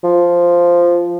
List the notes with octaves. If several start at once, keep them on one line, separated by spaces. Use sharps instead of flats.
F3